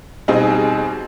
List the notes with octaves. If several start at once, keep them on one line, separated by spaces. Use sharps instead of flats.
B2 G3 C4 D#4 G#4